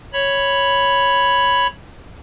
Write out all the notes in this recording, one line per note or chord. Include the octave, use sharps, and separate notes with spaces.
C#5 B5